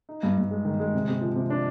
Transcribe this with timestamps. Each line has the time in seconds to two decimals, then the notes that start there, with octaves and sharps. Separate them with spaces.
0.09 D#4
0.23 G2
0.38 G2
0.51 G#3
0.65 D#3
0.80 G#3
0.94 C3
1.08 C3
1.21 F3
1.36 C3
1.50 D4